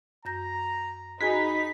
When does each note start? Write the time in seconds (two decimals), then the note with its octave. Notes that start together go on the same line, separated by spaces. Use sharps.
0.25 F#2 A#5 G6 A#6
1.21 D#4 F#4 G#4 G#5 B5 B6